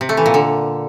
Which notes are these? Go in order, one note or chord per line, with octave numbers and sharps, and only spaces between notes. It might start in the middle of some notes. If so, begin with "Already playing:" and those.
C3
A3
E3
A#2
D3